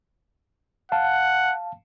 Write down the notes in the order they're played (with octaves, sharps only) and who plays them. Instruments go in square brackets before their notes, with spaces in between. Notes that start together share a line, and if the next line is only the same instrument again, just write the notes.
[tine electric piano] F5 A5 [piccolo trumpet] F#5